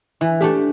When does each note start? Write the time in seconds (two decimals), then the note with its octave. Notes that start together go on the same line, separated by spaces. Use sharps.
0.21 E3 E4
0.41 A3 D4 G4